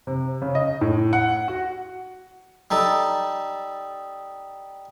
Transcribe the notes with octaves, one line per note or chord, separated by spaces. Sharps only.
C3
C#3
D#5
A2
F#5
F#4
G3 D#4 A4